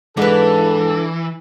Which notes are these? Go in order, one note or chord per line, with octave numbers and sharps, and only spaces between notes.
G#2 E3 D4 A4 B4